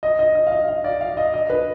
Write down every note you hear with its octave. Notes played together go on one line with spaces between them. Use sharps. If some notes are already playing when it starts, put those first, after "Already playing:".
D#5
D#5
D#5
F5
D#5
F5
D5
F5
D#5
D#5
B4